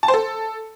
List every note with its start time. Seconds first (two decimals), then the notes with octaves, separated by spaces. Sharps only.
0.03 A5
0.08 C5
0.14 A4